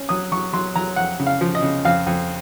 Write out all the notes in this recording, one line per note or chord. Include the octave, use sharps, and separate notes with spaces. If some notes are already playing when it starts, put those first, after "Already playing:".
Already playing: C#4
F#3 D#6
F#3 C#6
F#3 C6
F#3 A#5
F2 F#5
C#3
F5
F3
D#5
C#3
F2 F5
F2